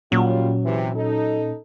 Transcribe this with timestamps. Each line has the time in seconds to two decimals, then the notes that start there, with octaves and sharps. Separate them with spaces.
0.12 D#2 A#2 F#3 G3 C#4 F4
0.64 C3 E3
0.95 D#4 A4